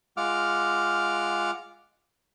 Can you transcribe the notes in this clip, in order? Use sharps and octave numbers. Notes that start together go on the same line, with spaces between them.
G#3 F4 F#5 D6 F6